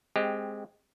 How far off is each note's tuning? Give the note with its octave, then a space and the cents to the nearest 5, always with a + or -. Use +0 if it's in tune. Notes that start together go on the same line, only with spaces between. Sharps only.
G#3 +0 C4 -5 G4 +10